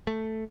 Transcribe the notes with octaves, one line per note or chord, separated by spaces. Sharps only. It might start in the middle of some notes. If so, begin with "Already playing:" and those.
A3